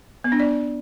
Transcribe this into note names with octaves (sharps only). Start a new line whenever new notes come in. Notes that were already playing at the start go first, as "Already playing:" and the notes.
B3
D4
D5